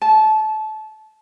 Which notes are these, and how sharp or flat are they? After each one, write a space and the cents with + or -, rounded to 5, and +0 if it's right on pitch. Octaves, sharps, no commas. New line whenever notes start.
A5 -25